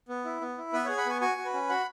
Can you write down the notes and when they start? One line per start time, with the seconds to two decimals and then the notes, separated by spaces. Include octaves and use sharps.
0.09 B3
0.25 E4
0.41 B3
0.58 E4
0.73 B3 B4 E5
0.85 C#5 F#5
0.89 G#4
0.97 F#5 B5
1.06 B3 G#5 C#6
1.21 F#4 G#5 C#6
1.37 F#4
1.45 B4
1.54 C#4
1.69 F#4 F#5 B5